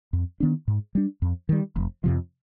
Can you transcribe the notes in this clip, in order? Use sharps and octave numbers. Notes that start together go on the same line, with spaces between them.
F2
D#3 B3 D4
G#2
G3 D4
F2
D#3 G3
F1
F2 C3 F3